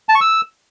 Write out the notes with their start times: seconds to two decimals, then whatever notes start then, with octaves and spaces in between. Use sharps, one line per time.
0.09 A5
0.15 C#6
0.21 E6